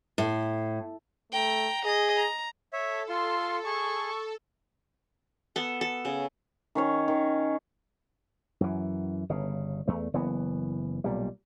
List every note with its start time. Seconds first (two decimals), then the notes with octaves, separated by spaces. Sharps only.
0.18 A2
1.32 A3 G5 A#5
1.85 G#4 D#5
2.16 A#5
2.73 A4 C#5 E5
3.09 F4 C6
3.66 G#4 C#6
5.56 B3 A4
5.81 A4
6.05 C#3
6.75 D#3 C#4 C#5
7.08 D#3
8.61 F#2 E3
9.29 G1 C#3
9.88 E2 A3
10.14 F#1 E3 B3
11.04 B1 A#2 G3